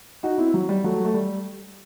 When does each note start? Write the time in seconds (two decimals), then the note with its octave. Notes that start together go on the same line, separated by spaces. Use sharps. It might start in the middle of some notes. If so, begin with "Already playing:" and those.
0.23 D#4 F#4
0.38 C4 E4
0.54 F#3
0.69 G3
0.84 F#3 A3
1.05 A3
1.14 G3